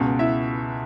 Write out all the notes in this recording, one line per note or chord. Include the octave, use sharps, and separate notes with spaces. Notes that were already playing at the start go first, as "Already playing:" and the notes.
Already playing: C#2 B2 F#4
E4 E5